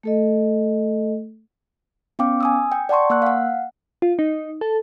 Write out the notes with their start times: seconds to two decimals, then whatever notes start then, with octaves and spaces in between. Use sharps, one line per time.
0.03 A3 A4 D#5
2.19 B3 C#4 F5 G5 D6
2.40 G#5 D#6 E6
2.72 G5
2.89 D5 F#5 A5 C6 C#6
3.10 A#3 F#5 E6 F#6
3.22 F5 F#5
4.02 F4
4.19 D#4
4.61 A4